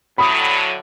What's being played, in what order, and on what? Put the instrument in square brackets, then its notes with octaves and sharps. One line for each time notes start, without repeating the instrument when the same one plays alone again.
[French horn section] A2 D3 F#3 [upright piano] B5 D#6